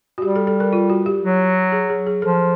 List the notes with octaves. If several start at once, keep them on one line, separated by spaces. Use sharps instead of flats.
F#4
G3 G4
A4
A4
A#4
F4
F#4
G4
F#3
G#4
G#4
G#4
F3 A4